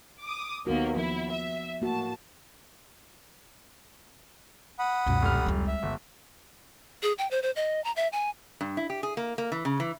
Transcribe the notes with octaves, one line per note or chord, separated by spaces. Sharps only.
D6 D#6
D#2 A#3 B3 F#4
F3 E4
E5
A2 A#3 F#4 A5
F#5 B5 D#6
C#2 F#2 B2
F1 F6
G3 G#3
E5
G1
G#4
G5
C5
C5
D#5
A#5
E5
G#5
G2
E4
G4
G#4
A#3
A#3
E3
C#3
E3